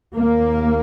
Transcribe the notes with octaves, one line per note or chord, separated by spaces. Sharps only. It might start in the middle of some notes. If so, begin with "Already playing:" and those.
D#2 A#3